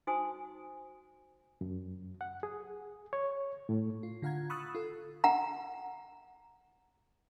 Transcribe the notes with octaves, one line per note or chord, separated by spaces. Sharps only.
D#4 F#4 C5 G#5 D#6
F#2
F#5
G#4
C#5
A2
F4
D3 F4 F5 F#5 A#5 G#6
B5 C#6 D#6 E6 F#6 A6
F4 A4
F#5 A#5